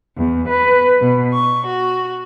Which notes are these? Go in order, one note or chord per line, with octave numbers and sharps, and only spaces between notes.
E2
B4
B2
C#6
F#4